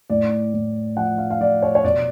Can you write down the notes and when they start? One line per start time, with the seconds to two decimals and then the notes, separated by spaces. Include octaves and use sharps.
0.10 A2 D5
0.54 A2
0.97 F3 F#5
1.18 F5
1.30 F5
1.40 F3 D5
1.63 C#5
1.75 C#5
1.84 B2 D5